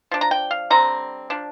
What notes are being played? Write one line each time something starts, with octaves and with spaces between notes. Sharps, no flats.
F3 D4
A#5
G5
F5
D3 G3 C4 A#5
F3 D4